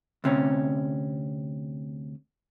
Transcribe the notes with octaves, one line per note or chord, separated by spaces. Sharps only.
D2 C3 C#4